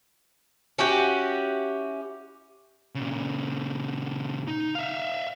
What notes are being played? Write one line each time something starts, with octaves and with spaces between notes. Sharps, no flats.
C#4 E4 F#4 G4
A#2 C#3
D#4
E5 F5